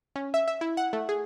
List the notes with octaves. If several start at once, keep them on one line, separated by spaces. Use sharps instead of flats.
C#4
E5
E5
E4
F#5
A3
G#4